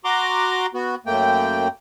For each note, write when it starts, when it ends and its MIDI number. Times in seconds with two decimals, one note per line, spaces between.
0.05 0.66 66
0.05 0.66 82
0.05 0.66 84
0.05 0.66 86
0.74 0.95 59
0.74 0.95 66
1.06 1.68 42
1.06 1.68 57
1.06 1.68 58
1.06 1.68 79